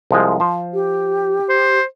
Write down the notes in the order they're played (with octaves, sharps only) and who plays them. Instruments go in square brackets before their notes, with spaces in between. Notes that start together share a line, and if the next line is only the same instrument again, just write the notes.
[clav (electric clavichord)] C2 F3 G#3
F3 C5
[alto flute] G4
[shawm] C5